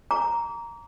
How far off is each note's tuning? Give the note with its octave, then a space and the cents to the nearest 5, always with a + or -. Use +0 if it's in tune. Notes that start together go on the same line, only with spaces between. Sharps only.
A#5 +0 D6 -35